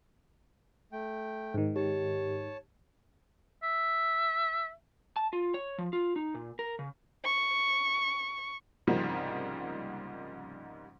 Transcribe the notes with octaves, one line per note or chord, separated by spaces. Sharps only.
A3 G5
G#2 D#3
G4 C#5 A5
E5
A5
F4
C#5
F3
F4
D#4
A#2
A#4
C#3
C#6
C2 G#2 C#3 F3 G3 A#3